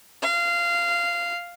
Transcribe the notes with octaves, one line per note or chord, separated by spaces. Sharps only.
F5